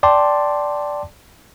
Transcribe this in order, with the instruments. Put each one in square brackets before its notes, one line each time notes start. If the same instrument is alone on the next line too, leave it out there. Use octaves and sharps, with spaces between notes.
[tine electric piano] D5 G5 A5 C6 D6